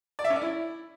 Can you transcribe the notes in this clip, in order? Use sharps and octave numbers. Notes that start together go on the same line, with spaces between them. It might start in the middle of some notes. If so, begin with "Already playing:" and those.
D5
E5
C#4
D5
E4